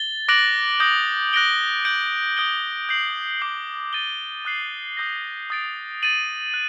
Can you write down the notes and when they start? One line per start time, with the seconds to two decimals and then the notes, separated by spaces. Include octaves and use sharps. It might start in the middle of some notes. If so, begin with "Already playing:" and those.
Already playing: A6 G7
0.29 D6 F#6 A#6 D7 F#7
0.80 D#6 G6 A#6 F#7
1.33 F#6 A#6 D7 G7
1.85 G6 D7 F#7
2.37 D#6 G6 D7 G7
2.89 G6 C7 F#7
3.41 D6 G6 C7 F#7
3.93 D6 A6 D#7 G7
4.45 D#6 F#6 C7 F#7
4.97 D#6 G6 A#6
5.50 D#6 A6 D7
6.02 A6 D#7 F#7
6.54 F#6